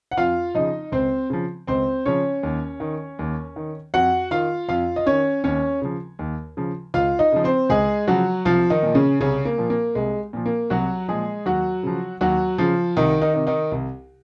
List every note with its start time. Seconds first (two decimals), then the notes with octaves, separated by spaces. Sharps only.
0.11 F#5
0.17 F2 F4 F5
0.55 C#3 F3 D#4 D#5
0.92 C#2 C4 C5
1.30 C#3 F3
1.67 C#2 C4 C5
2.05 C#3 F3 C#4 C#5
2.43 D#2
2.80 D#3
3.19 D#2
3.56 D#3
3.94 F2 F#4 F#5
4.31 D#3 F4 F5
4.69 F2 F4 F5
4.96 D#5
5.06 D#3 C#4 C#5
5.44 D#2 C#4 C#5
5.82 C#3 F3
6.19 D#2
6.57 C#3 F3
6.94 C#2 F4 F5
7.19 D#4 D#5
7.32 C#3 F3
7.44 C4 C5
7.69 C#2 G#3 G#4
8.07 C#3 F3 F#3 F#4
8.45 C2 F3 F4
8.70 D#3 D#4
8.83 A#2 F3
8.95 C#3 C#4
9.20 C2 C#3 C#4
9.45 A#3
9.58 A#2 F3
9.70 A#3
9.95 C2 G#3
10.33 A#2 F3
10.46 A#3
10.70 C2 F#3 F#4
11.08 A#2 F3 G#3 G#4
11.46 D#2 F#3 F#4
11.83 C#3 F3
12.21 D#2 F#3 F#4
12.58 C#3 F3 F4
12.97 C2 D#3 D#4
13.21 D#3 D#4
13.34 C3 D#3
13.47 D#3 D#4
13.72 C2